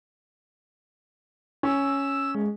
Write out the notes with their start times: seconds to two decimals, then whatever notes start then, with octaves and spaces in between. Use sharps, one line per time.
1.63 C#4 E6
2.35 G#3